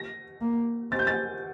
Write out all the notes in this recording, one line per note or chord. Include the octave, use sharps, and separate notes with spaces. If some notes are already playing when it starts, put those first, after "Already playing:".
Already playing: A#6
A#3
C4 A6
G6
A6